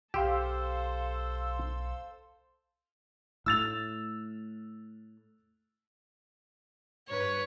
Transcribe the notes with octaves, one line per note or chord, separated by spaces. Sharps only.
B1 G4 A4 C5 F5 C6 E6
A2 A3 E6 A6 F7
G2 B4 C#5